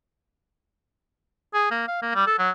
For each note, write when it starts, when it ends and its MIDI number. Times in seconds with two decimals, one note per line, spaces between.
1.54 1.66 68
1.71 1.83 58
1.88 1.98 77
2.02 2.12 58
2.15 2.26 55
2.26 2.34 69
2.39 2.50 54